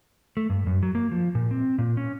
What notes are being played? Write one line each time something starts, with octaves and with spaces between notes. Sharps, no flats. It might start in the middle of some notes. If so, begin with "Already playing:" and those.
A3
G2
F#2
F#3
A#3
F3
A#2
C4
A#2
C#4